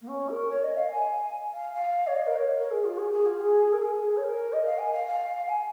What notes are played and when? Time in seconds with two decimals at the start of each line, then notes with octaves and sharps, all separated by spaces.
0.01 A#3
0.07 C#4
0.29 A#4
0.49 C#5
0.63 D#5
0.76 F5
0.91 G#5
1.53 F5
1.73 F5
2.07 C#5
2.15 D#5
2.26 A#4
2.36 C#5
2.57 A#4
2.70 G#4
2.84 F4
2.98 G#4
3.12 G#4
3.26 F4
3.40 G#4
3.72 A#4
3.82 G#4
4.16 C#5
4.24 A#4
4.52 D#5
4.66 F5
4.78 G#5
4.92 F5
5.06 F5
5.48 G#5